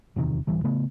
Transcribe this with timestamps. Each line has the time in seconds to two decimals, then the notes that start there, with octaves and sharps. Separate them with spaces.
0.16 D1 E2 C3 D#3
0.47 D1 A1 E3 G3
0.64 C#3 A3 B3